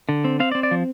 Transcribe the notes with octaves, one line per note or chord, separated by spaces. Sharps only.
D3
C4
C4 F5
D5
C4
D5
F3